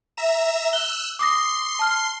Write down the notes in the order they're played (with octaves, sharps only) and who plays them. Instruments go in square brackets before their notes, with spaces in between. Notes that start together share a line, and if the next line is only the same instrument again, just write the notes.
[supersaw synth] E5 A#5 E7
[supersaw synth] E6 F#6 [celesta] G7
[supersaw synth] C6 C7 [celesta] D6 D#6 A#6
[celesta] A5 F6